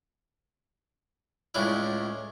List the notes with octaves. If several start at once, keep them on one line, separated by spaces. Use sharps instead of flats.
C#2 A2 C#3 D4 E4